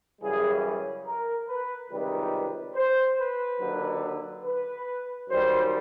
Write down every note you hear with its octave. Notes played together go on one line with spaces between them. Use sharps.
F#2 C#3 E3 G3 G#4
A#4
B4
C#2 C3 D#3 G3 B4
C5
B4
D#2 D3 F#3
B4
F#2 D#3 G3 C5